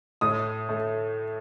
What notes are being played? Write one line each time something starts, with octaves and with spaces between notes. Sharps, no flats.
A2 D#6
A3